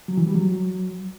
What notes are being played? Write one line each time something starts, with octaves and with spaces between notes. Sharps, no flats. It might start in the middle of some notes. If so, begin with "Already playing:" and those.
F#3
E3
G3
F#3